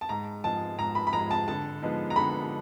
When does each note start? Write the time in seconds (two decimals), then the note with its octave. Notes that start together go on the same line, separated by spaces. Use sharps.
0.01 A5
0.09 G#2 A#5
0.44 F3 G#3 A5
0.78 G#2 A#5
0.95 B5
1.07 B5
1.13 F3 G#3 A#5
1.31 A5
1.48 D3 A5
1.81 F3 G#3 B3 D#4
2.10 A#5
2.16 D3 B5